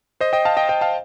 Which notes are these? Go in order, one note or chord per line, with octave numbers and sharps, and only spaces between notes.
C5 D#5
D#5 G5
F5 A5
D#5 G5
D#5 G5
F5 A5